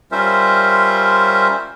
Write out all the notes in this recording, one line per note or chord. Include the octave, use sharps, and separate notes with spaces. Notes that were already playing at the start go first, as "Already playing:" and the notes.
G3 C#4 F4 A#4 C5 E5